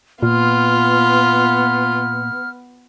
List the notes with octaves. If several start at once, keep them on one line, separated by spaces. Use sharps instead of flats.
A#2 B3 F4 F6